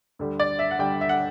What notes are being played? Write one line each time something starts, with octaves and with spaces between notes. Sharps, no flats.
D2 D3 G3
D5
E5
F#5
D2 D3 G3 G5
E5
F#5